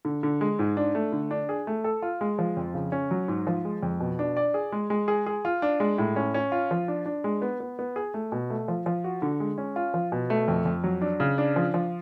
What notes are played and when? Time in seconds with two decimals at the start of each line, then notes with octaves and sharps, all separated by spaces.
0.05 D3
0.23 D3
0.41 G#3
0.59 G#2
0.77 D4
0.95 A3
1.13 D3
1.31 D4
1.49 G#4
1.67 A3
1.84 A4
2.02 F4
2.21 G#3
2.39 F3
2.57 F2
2.74 C#3
2.92 C#4
3.11 F#3
3.28 G#2
3.47 F3
3.65 G#3
3.83 F2
4.00 B2
4.19 D4
4.37 D5
4.54 G#4
4.72 G#3
4.90 G#3
5.08 G#4
5.26 G#4
5.45 F4
5.62 D4
5.80 G#3
5.98 A2
6.16 C#4
6.34 C#4
6.52 F4
6.71 F3
6.88 D4
7.06 D4
7.24 G#3
7.42 B3
7.60 B3
7.79 B3
7.96 G#4
8.14 A3
8.32 B2
8.50 A3
8.68 F3
8.86 F3
9.04 F#4
9.22 D3
9.40 G#3
9.58 C#4
9.76 F4
9.94 F3
10.12 B2
10.30 A3
10.48 F2
10.65 F2
10.84 F#3
11.02 D4
11.20 C#3
11.38 D4
11.56 F3
11.74 F3